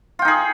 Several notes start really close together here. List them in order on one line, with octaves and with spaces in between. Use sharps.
F4 G5 D#4 G#4